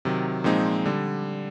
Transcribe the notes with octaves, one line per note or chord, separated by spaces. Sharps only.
C3 D#3 F#3
A#2 F3 G#3 C4 D#4
D3 G3